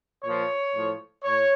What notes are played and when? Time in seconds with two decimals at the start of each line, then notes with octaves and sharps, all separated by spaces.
0.23 A#2 F3 C#5
0.74 A2 F3
1.23 A2 C#5